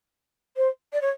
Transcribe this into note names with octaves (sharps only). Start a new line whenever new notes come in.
C5
D5
C#5